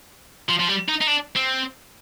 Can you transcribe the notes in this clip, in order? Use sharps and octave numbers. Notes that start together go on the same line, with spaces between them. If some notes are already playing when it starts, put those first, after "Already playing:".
F3
F3
G3
D#4
D#4
D4
C4